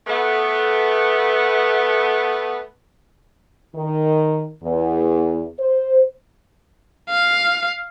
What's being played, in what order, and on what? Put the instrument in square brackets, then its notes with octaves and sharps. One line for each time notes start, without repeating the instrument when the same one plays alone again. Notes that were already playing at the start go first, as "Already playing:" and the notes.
[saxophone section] A3 B3
[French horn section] D#3
E2
C5
[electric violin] F5